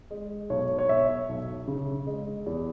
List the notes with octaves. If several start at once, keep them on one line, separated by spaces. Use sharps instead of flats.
G#3
B1 C#5
C#5
B2 E5
B1
C#3
G#3
E2